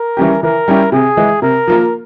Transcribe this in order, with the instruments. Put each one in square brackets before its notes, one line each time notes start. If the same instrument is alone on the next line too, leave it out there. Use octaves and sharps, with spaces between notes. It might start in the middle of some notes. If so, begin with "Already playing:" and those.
Already playing: [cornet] A#4
[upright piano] E3 G3 C#4 G4
[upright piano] E3 [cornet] A#4
[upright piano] G3 C#4 E4 G4
[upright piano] C3 [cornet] G#4
[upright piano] E3 G#3
[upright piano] C3 [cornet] A#4
[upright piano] F3 A#3 F4